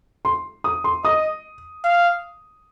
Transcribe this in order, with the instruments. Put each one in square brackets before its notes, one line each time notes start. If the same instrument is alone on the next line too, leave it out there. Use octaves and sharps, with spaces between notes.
[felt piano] C6
D#6
C6
[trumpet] D#5 [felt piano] D#6
[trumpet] F5